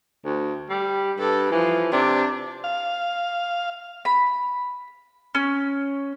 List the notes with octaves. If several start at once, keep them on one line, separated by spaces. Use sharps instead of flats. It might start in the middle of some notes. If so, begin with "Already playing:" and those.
D2
G3
G2 A4
E3 F3
C3 D4
F5
B5
C#4